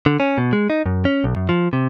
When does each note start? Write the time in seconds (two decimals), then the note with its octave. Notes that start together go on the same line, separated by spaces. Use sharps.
0.06 D3
0.20 C#4
0.38 B2
0.53 G#3
0.70 D#4
0.86 F#2
1.05 C#4
1.24 B1
1.36 F#2
1.49 F3
1.73 C3